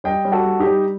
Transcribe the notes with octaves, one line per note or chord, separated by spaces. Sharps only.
G3 D#5 G5
G3
F#4 A4
G3
D#4 G4
G3